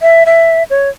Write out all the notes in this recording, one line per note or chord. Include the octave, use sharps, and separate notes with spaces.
E5
E5
C#5